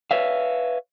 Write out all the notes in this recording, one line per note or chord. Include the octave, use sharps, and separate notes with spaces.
B4 C#5 E5 F5